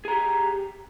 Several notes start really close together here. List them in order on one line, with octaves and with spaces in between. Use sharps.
G#4 A#5 G4